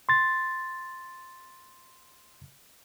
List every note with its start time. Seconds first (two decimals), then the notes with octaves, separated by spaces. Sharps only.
0.09 C6 A6